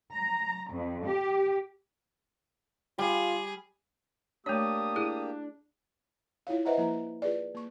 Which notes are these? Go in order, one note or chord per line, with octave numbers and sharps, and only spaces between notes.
A#5
F2
G4
G3 F4 G#4
A3 A#3 D4 G4 C#5 D#6
E4 G#4
E4 F4 C#5 F5
B4 C5 D#5 E5 F#5 A#5
F3 A#3 E4 A#5
F4 G#4 B4 D5
A#3 C#6